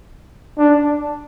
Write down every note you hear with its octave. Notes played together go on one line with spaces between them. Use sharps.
D4